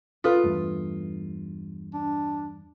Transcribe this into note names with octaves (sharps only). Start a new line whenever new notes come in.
F4 A4 B4 D#6
E2 G2 A3
D4